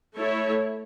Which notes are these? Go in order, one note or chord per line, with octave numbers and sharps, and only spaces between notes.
A3 E4 A4 C#5